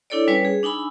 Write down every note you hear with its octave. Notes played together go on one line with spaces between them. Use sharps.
D4 E4 A4 C#5 D5
G3 C#4 F4 B4 C#5 G#5
G#4
D4 D#4 G#5 B5 E6